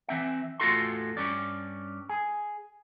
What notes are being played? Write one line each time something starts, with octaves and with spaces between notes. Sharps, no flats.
E3 C4 E5
E2 A2 F4 F#4 A4 C6
G2 C#4 D5
G#4